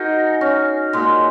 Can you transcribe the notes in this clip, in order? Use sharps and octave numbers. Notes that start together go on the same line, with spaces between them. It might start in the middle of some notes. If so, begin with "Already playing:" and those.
Already playing: D#4 F#4 G#4 A#4 D#5
C#4
A#2 G#3